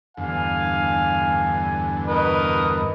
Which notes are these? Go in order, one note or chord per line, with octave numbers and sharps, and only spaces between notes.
E2 G2 D3 F5 G#5
A#4 B4 D#5